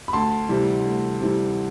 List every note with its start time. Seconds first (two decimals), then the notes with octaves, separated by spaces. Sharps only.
0.08 B5
0.13 D2 A5 C6
0.49 C3 E3 G3
0.85 D2
1.21 C3 E3 G3